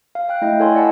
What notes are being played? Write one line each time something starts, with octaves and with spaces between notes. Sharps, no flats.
F5
F5 G5 F#6
A3 E4 D#5 G5
E4 A4 C#5 G#5 C6
D5 D#5 F#5 G#5 A5 B5